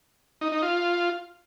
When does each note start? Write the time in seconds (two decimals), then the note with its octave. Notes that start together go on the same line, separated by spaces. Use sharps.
0.41 D#4
0.52 D#4
0.62 F4